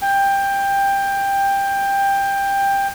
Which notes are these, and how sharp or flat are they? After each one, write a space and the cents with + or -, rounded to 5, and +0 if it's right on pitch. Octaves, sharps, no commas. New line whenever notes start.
G5 +15